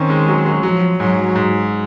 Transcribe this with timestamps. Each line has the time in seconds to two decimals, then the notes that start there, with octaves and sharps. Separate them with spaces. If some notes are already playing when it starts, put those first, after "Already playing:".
Already playing: D#3 C4 C#4 D#4
0.10 G#3
0.28 F#3
0.46 F#3
0.63 F3 F#3
1.00 G#2 F#3
1.35 G#2